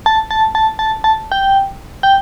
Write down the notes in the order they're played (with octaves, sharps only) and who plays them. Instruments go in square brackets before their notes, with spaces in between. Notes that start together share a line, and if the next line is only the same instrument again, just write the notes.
[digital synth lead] A5
A5
A5
A5
A5
G5
G5